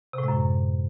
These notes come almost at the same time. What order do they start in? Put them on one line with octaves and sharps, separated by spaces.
C3 A2 G#3 F#2